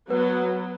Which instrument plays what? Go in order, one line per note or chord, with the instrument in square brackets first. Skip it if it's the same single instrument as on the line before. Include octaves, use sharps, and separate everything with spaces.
[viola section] F#3 B3 [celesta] B4